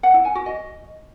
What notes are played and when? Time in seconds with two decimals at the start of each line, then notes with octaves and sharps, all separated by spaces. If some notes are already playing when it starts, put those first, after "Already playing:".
0.03 F#5
0.14 E4
0.25 G#5
0.35 F#4
0.46 D#5